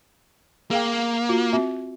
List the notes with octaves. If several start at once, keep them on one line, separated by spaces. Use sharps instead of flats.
A#3 G#4 F5 G5
F4 F#4
C4 F#4 E5